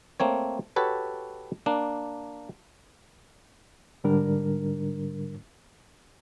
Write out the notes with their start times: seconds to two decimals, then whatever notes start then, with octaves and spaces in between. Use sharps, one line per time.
0.20 A3 A#3 C4 C#5
0.76 F#4 G4 A4 B4 C#5
1.66 A#3 D4
4.04 G#2 D3 G3 D4 A#4